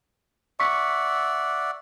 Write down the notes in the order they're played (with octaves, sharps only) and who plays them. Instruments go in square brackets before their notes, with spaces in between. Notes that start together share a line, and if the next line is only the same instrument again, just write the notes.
[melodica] D5 E5 F#5 [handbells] C#6 B6